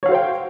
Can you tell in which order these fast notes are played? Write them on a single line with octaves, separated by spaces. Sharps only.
C#5 F5 F#4 C5 G5